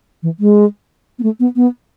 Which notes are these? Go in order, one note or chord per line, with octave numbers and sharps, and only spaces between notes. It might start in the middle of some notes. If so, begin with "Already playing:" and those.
E3
G#3
B3
A3
B3
B3